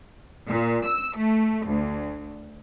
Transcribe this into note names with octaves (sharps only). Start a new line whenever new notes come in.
A#2
E6
A3
D2